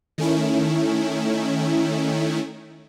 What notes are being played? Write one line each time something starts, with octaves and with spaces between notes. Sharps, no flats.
D#3 A3 C#4 E4